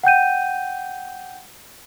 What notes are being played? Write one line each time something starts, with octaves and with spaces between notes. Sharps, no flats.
F#5 G5 G6 D#7